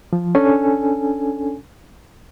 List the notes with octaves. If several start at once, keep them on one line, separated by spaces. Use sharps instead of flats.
F3
C#4 D4 A4 G#5